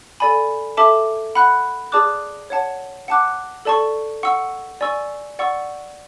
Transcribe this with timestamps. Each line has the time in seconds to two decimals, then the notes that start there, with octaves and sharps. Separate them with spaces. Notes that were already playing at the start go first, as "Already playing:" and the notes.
0.20 A4 D5 G#5 B5
0.77 A4 E5 A5 D6
1.35 F#5 B5 F#6
1.92 G#4 D5 A5 D6 F#6
2.50 C#5 F#5 A5
3.08 F#5 A5 D6 F#6
3.65 A4 D5 A5 C#6
4.23 F#5 C#6 E6
4.81 D5 G#5 C#6 E6
5.39 D5 F#5 C#6 E6